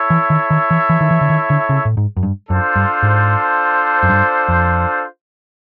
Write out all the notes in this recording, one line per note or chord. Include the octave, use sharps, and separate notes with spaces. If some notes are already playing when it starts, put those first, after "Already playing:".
Already playing: E4 A4 C#5 E5
E3
D#3
D#3
E3
E3
D#3
E3
D3
D#3
D3
C#3
A2
G#2
F#2
G2
F#2 D4 F4 A4 C5
G2
G#2
F#2
G2
F2